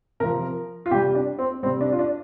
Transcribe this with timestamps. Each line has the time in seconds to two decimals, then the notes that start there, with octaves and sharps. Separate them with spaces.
0.20 C3 F3 A#4
0.86 F4
0.91 C3 G3 G4
1.15 D4
1.39 C4
1.63 G3 C4
1.66 C3
1.81 D4
1.92 F4
1.99 D4